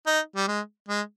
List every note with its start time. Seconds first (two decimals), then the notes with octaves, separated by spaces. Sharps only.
0.07 D#4
0.36 G3
0.48 G#3
0.89 G#3